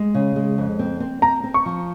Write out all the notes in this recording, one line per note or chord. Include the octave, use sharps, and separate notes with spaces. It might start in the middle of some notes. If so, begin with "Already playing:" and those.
Already playing: G#3
C#3
G#3
F2
C4
C4
C4 A#5
C4
C#6
F3